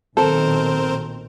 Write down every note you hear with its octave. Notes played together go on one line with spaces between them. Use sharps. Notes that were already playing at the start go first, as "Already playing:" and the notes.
B1 A#2 D#3 C4 A4 A#4 C5